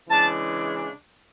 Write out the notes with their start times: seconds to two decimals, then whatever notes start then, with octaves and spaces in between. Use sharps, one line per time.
0.09 C#3 E3 G#3 D4 A5